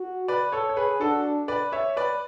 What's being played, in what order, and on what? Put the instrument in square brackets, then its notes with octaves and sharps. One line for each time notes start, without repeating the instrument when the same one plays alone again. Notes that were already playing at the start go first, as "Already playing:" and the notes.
Already playing: [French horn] F#4
[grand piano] B4 D5
A4 C#5
C#5
G#4 B4
[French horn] D4 [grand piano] F#4 A4
[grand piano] B4 D5
C#5 E5
B4 D5